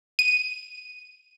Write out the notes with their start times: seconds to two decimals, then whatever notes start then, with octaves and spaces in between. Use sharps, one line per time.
0.19 D#7